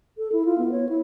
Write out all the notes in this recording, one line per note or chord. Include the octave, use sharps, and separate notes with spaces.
A4
E4
F4
B3
C#5
E4